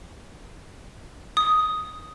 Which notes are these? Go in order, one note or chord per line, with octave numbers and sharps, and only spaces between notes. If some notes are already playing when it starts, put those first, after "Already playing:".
D#6